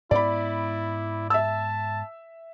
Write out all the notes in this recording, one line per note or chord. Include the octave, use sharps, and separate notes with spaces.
G#2 B3 E4 D5 B5
E5 A5 E6